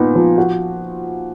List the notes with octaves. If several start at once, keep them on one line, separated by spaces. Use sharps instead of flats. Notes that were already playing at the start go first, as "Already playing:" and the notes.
Already playing: A#2 B3 D#4
F3
F#4